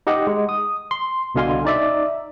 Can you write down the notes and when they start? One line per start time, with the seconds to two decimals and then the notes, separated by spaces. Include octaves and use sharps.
0.07 D#4 G4 D#5 F#5
0.27 G#3
0.49 D#6
0.91 C6
1.35 C2 B2 D3 F5 G#5 C6
1.65 D#4 D5 E5